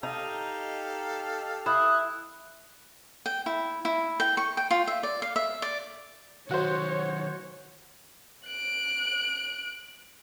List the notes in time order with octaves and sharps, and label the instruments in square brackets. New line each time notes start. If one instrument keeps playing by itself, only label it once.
[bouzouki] D#4 [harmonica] G4 A4 F5
[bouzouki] E4 [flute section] D#6 F#6
[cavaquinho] G5
E4
E4
G5
C#6
G5
F4
E5
D5
F5
E5
D5
[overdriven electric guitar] D#3 F#3 [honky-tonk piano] F#4 C5 [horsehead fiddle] C#5
[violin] F#6 D7